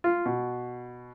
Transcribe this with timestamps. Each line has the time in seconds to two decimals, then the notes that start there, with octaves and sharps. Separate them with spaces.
0.04 F4
0.26 B2